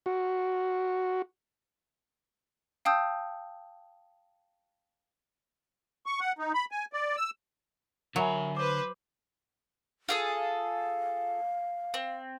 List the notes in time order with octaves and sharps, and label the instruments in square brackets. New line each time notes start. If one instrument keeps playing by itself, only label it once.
[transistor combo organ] F#4
[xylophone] F5 G5 A5 D#6 E6 G6
[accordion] C#6
F#5
D#4
B5
G#5
D5
E6
[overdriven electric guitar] D3 B5 [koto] F#3 [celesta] A#4 E5 G#5
[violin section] B4 C5 [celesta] D6
[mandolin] F4 G#4 A4
[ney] F5
[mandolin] C4